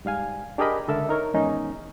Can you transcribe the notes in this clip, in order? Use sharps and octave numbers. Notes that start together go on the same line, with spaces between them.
G#2 G3 F5 G#5
D4 G4 G#4 A#4 D#5 B5
C#2 D3 A4 A#4 E5 E6
D#4 A#4 C#5
E2 G#2 D#3 C#4 D#4